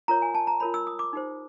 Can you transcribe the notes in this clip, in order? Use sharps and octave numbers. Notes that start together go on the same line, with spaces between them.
F4 A#4 C#5 A#5
G#5
A5
A#5
F4 A#4 C#5 B5
E6
D#6
D6
D#4 G4 C5